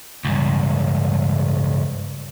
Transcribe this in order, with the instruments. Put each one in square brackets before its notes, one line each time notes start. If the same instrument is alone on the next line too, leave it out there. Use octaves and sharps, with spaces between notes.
[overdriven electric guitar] C#2 G2